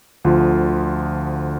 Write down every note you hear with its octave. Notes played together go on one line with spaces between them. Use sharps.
D2 D3 F3 F4